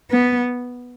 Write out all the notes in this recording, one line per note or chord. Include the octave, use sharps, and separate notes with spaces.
B3